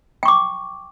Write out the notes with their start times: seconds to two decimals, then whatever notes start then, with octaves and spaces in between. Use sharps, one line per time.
0.23 G5
0.25 C#6
0.28 D6